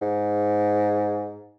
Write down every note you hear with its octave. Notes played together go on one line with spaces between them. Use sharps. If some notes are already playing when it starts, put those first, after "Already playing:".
G#2